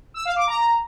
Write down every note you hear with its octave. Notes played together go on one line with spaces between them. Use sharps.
E6
F5
D6
A#5